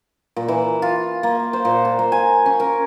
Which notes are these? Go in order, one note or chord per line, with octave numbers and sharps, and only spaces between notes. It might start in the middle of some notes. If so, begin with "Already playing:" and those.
A#2
E3
F4
A#3
C5
A#2
A5
A#3
G#5
C#4
A#4